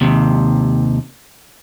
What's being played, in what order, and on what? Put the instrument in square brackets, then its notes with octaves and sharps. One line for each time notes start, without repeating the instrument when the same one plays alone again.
[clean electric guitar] D#2 C3